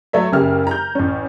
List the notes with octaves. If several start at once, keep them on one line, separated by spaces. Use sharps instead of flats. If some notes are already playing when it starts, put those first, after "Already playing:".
F#3 A3 C#5 E5
F#1 C#3 A#3 G4 E5 F6
A#5 G6
A1 C#4